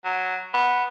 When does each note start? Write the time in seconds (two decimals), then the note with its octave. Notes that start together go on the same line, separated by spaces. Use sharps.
0.05 F#3
0.54 B3